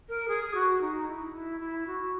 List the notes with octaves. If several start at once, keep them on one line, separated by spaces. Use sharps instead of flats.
A#4
G#4
F#4
D#4
E4
E4
E4
F#4